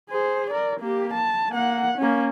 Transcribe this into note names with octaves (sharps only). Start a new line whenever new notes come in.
G#4 C5
A#4 D5
A#3 G4
A5
A#3 F#5
A#3 C#4